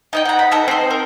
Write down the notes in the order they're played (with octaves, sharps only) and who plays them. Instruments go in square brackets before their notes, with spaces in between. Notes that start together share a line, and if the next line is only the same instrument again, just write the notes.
[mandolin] D#4 D#5 G5
F#5 A#5
B5
D#4 A4 A#5
C4 C5
A#4